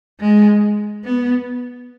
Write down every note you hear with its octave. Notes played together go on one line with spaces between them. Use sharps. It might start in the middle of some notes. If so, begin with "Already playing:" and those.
G#3
B3